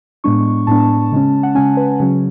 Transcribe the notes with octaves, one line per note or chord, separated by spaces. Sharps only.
A2 G#3 B3 D4 C#6
A2 G#3 B3 D4 A5
C#3 G#3 C#4
F#5
C#3 G#3 C#4 G#5
B4
C#3 F#3 C#4